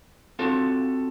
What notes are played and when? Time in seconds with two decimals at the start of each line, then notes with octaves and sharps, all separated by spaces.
0.39 C4 F4 F#4 A4 C#5